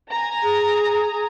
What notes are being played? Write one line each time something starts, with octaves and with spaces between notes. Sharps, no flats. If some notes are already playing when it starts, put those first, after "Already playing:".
G#5 A#5
G#4